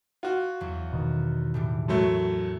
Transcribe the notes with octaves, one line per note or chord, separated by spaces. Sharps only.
F4 F#4
E2 F#3
B2 D#3
A2 E3 G3
F#2 F#3 A3